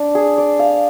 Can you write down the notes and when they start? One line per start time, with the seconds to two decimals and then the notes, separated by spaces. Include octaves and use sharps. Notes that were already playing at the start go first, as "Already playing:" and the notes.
Already playing: D4
0.15 G#4
0.38 D5
0.59 F5